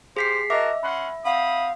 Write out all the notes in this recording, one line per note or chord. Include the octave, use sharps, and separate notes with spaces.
G4 G#4 C5 F5 B6 C7
F#4 A#4 D#5 E5 A5 D6
C#4 F#5 B5 C6
C4 F5 F#5 B5 D#6